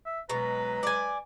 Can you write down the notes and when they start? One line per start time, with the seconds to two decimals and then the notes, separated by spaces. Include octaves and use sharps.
0.06 E5
0.30 B2 F#3 G#3 B4 A#5
0.83 D5 G#5